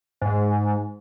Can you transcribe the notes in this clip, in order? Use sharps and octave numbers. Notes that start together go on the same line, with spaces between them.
G#2